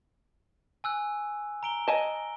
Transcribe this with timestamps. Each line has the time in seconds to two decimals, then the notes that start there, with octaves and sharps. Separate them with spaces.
0.84 G#5 E6 F#6
1.63 A#5 D7 G7
1.88 D#5 G#5 A5